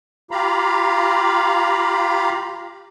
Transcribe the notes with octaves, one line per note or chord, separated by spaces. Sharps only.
F4 G4 F5 A#5 B5